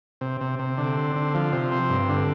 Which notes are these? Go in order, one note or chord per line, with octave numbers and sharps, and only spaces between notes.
C3
C3
C3
D3
C4
D3
F3
C3
C4
G2
D3